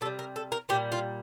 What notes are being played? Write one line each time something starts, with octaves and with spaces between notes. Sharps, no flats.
C3 G3 A4
A#4
A4
A#4
A#2 G3 G4
F4